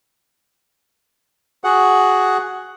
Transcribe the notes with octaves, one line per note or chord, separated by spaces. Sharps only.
F#4 G#4 F#5